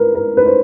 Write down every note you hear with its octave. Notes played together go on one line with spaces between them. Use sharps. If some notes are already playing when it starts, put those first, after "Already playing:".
Already playing: A#4 B4
A#4
B4
C5